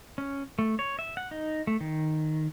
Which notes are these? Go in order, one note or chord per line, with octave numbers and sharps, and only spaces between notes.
C#4
A3
C#5
E5
F#5
D#4
A3
D#3